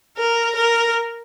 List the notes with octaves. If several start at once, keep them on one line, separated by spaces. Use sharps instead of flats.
A#4
A#4